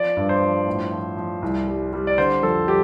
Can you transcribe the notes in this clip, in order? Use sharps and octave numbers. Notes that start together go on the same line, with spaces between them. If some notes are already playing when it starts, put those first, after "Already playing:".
Already playing: F3 D5
G2
C5
F3
A2
F3
F3
C2
G3
G3
D5
D3 C5
F2 A4
G3 G4